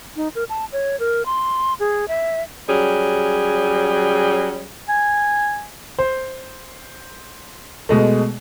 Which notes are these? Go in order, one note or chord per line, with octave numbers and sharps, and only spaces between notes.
D#4
A#4
A5
C#5
A#4
C6
G#4
E5
F#3 G3 C#4 G#4
G#5
C5
B2 G#3 A3